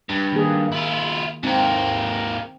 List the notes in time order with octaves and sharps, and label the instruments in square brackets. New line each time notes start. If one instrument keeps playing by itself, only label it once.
[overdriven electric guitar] G2
[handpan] D#3 A#3 G#4
[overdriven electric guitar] E4 F4
[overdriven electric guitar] G#2 A#3 [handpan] C4